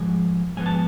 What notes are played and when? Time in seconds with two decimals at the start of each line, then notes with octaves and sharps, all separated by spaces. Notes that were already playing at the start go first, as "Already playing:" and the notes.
Already playing: G#2 F3 G#3 G#5
0.57 G#2 F3 B3 G#5
0.66 A5